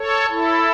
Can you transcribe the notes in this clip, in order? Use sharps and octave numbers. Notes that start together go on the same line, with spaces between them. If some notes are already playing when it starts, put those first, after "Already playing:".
Already playing: A4 C#5
E4 A4